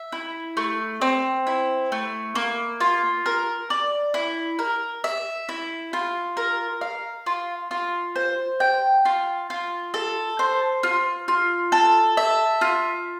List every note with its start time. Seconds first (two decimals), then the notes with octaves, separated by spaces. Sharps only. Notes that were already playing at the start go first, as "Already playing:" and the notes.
Already playing: E5
0.12 E4
0.57 A3
1.01 C4
1.47 E4
1.92 A3
2.35 A#3
2.80 F4
3.26 A#4
3.70 D5
4.14 E4
4.59 A#4
5.04 E5
5.49 E4
5.93 F4
6.37 A#4
6.81 F5
7.26 F4
7.71 F4
8.16 C5
8.60 G5
9.05 F4
9.50 F4
9.94 A4
10.39 C5
10.83 F4
11.28 F4
11.72 A4
12.17 E5
12.61 F4